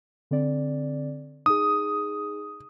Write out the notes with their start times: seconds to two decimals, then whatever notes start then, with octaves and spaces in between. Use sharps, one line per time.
0.31 D3 C4 D5
1.46 D#4 G#4 D#6